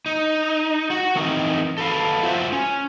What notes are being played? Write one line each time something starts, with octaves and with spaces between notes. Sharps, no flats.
D#4
F#4
E3 C4 D#4 A#4
A4 B4 F5
F4 F#4 C5 E5
C#4